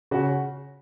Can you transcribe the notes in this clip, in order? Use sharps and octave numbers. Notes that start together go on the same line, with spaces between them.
C#3 F#4